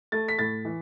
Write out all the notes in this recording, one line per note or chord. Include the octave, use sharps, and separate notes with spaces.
A3 A6
B6
A2 A6
E3